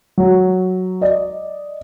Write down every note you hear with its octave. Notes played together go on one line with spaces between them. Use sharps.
F#3
D5 D#5